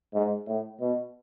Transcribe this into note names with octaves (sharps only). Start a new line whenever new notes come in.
G#2
A2
B2